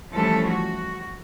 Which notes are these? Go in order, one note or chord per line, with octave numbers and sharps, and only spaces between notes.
E3 F3 G3 A3 C#4 A4
F#4